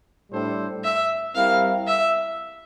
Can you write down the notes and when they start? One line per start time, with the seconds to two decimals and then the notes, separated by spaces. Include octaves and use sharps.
0.31 A2 G3 D4 A4 C5
0.84 E5
1.35 G3 C4 E4 A#4 F5
1.87 E5